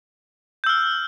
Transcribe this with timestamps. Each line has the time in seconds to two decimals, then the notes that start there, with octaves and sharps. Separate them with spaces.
0.64 G6
0.66 E6
0.69 F6